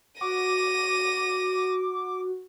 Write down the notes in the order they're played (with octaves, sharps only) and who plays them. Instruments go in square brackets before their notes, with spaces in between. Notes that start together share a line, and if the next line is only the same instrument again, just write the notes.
[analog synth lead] F#4 [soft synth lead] D6 [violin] A#6 D#7